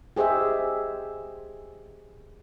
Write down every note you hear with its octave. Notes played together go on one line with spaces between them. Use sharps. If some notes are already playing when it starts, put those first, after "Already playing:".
G4 G#4 C5 D#5 E5